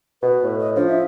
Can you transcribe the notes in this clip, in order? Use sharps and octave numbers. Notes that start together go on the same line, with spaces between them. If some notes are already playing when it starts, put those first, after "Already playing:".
B2 B4
A2
D#5
F3 D4
E5